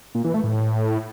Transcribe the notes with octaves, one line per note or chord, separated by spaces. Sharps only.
A#2
E3
A3
A2